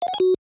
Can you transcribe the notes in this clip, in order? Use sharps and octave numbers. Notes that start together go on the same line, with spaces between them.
F5
F#5
G#5
F#4